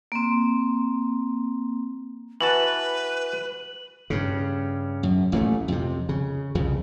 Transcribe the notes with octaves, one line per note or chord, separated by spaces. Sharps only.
A#3 C4
E3 F#4 B4 A5 F#7
G2 C#3
F#2
A1 A#2 D3 A3
F2 C3
C#3
C2 F2 C#3